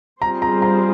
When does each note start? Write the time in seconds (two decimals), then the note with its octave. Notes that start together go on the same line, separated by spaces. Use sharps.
0.22 G3 C4 F4 G#4 C5 A#5
0.42 A#5
0.62 A#5